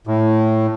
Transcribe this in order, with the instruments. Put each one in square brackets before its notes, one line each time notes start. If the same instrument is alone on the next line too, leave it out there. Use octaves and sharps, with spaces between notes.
[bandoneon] A2